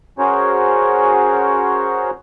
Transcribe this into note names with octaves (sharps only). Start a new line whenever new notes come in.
C#4 F#4 G#4 A#4 C5 C#5